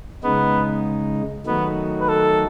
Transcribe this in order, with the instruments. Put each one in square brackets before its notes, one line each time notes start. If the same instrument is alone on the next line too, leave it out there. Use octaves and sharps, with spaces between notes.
[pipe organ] C#3 G#3 D#4 [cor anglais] B3
[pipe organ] D#3 F#3 A3 D#4 F#4 [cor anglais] B3
[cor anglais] B4
A4